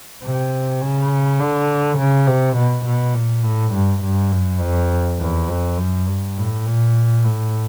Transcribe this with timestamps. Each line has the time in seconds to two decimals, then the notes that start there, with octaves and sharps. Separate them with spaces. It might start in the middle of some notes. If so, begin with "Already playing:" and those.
0.23 C3
0.82 C#3
1.39 D3
1.98 C#3
2.27 C3
2.57 B2
2.85 B2
3.14 A#2
3.44 A2
3.73 G2
4.03 G2
4.31 F#2
4.61 F2
5.19 E2
5.49 F2
5.77 F#2
6.08 G2
6.37 A2
6.66 A#2
7.24 A2